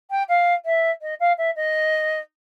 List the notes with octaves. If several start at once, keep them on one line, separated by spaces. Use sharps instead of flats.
G5
F5
E5
D#5
F5
E5
D#5